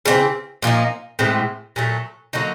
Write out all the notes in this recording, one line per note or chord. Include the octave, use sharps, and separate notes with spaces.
C#3 E3 A3 C4
A#2 F3 A#3 D#4
A2 E3 G#3 C4
A#2 F#3 A3
D3 F#3 A#3 D#4